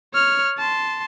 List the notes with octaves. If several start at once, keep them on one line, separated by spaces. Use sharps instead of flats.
C#5 F6
A5 C6